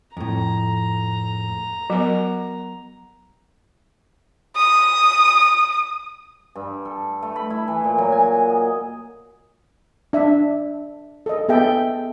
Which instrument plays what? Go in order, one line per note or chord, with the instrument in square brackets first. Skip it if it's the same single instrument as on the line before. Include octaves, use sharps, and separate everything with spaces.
[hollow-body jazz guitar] F2 A2 [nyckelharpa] A#5
[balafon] F#3 B3 [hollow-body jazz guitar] F#4 A#4
[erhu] D#6
[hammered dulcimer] G2
A4
A3
B5
E4
E3
A#2
F#3
G#5
D#5
[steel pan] D4 E5
A4 D#5
B3 G#4 A4 E5 G5